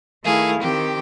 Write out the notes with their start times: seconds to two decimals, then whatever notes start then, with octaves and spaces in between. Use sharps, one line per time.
0.24 D#3 A3 E4 G#4 F5
0.59 D#3 C4 G4